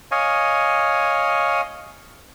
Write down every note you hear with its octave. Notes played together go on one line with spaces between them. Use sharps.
C#5 D#5 F5 G#5